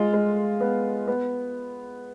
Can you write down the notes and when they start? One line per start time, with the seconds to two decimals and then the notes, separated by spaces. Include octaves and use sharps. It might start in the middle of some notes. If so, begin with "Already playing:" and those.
Already playing: G#3 F4
0.13 G#3
0.61 B3
1.08 B3